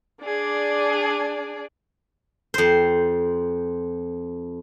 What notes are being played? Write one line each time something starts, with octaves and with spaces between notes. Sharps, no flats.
D4 G#4 D5
F2 C5